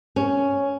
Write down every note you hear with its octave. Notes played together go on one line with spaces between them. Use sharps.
C#4